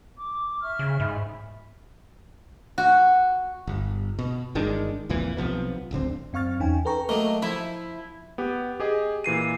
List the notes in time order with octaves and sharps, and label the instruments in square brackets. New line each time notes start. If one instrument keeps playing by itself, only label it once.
[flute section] D6
E5 C#6 F6
[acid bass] C#3
[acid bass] G#2 [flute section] E5 B5
[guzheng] F#4
[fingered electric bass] G1
B2
G1 D#3 G#3 D4
C2 F2 A#2 E3
B1 C3 F3 B3
D1 G#1 D3 C4
[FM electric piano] F#2 C4 F5 C#6 F6 A6
E2 C#4 D#4 G5 G#5
A4 B4 G5 A#5 C#6
[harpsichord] F#3 A3 A#3 [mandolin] D#5
[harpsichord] F3 [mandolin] E4
[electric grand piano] B3 G4
G4 G#4 D#5
A#2 E3 C7 D#7